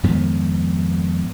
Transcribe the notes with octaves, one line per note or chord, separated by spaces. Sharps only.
F2 G#2 D#3 B3